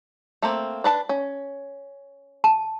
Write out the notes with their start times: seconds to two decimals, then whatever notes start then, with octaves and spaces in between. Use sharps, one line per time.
0.42 A3 A#3 C4
0.84 D4 B4 A5
1.09 C#4
2.44 A5